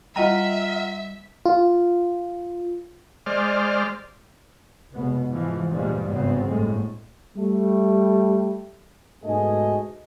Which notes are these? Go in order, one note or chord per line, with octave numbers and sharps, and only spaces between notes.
G3 F4 D#5 E5 F#5 A#5
F4
G#3 C5 D5 F6
F1 B2 G#3 B3
G#2 E3 F3
D2 G2 A#2 F3 G3 G#3
G#1 C#3 B3 C4
G1 A2 G#3
G3 A3
G#2 B2 A3 G#4 D#5 G#5